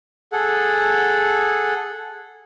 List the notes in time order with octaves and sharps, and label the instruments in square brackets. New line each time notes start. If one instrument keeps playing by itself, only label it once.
[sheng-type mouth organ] G#4 A4 F#5